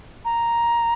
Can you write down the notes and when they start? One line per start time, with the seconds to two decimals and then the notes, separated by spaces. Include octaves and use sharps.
0.25 A#5